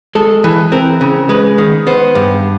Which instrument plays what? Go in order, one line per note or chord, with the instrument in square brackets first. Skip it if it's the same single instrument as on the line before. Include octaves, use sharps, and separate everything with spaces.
[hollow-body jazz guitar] G#3 A4
E3
C4 A#4
C#3
G#3 B4
D#3
B3 C5
G2